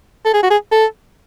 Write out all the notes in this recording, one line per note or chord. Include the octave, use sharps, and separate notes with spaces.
A4
G#4
F#4
G#4
A4